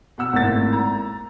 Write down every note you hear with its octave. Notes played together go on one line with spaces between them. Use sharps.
B2 F#5 E6
G#1 A2 A#3 A6
A#5